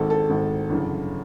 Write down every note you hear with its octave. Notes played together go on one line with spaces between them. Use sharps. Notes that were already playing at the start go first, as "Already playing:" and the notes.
Already playing: G#1 G#2 D#3 A4
A4
G#1 G#2 D#3
G1 F#2 C#3 E3